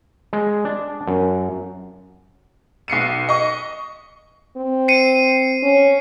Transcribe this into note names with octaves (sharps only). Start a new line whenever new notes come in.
G#3
D4
F#2
B1 C7 C#7 D#7
D#5 C#6
C4
C7 C#7 D#7
C#4